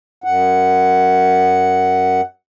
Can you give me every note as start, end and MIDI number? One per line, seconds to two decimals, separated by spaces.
0.24 2.21 42
0.24 2.21 78